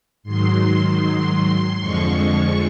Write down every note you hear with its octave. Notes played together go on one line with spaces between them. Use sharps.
G#2 D#3 F#3 C6
F2 D3 F3 G#3 C#6